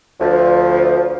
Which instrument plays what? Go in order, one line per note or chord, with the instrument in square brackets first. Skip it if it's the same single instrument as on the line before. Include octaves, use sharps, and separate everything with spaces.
[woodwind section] D2 F3